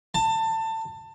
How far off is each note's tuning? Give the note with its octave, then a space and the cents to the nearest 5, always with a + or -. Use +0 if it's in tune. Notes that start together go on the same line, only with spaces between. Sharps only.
A5 +25